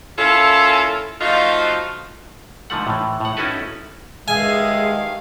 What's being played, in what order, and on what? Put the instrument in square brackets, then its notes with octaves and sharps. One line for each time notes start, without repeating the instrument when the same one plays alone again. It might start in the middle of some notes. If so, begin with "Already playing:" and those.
[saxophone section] A#3 C#4 E4 F4 A4
F3 A3 D#4 F4 F#4 D#5
[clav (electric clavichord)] G#2 D3 F3 A3 F#5
A2 E3
A2 F#5
C#4 D#4 E4 F#4 A4 B4
[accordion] G2 D#3 F5 [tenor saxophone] G#3 [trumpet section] G#4 E5 [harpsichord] G#5